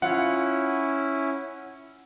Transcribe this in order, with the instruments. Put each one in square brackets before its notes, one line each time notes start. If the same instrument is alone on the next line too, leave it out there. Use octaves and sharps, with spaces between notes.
[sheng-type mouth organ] C#4 E4 [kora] F4 F5 [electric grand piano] F#5